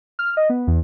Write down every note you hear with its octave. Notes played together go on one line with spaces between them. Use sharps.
F6
D#5
B3
E2